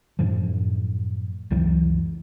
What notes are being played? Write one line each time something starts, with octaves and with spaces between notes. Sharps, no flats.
F#2 A2 F3
C#2 F#2 E3 F#3